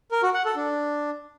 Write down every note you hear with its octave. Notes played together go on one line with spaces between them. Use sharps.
A#4
F#4
F#5
A4
D4